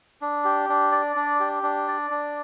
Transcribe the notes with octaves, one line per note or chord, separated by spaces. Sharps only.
D4
G4
D4
D5
D4
G4
D4
D5
D4